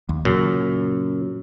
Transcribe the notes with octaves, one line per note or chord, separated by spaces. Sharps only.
D#2
F#2 A#2 C#3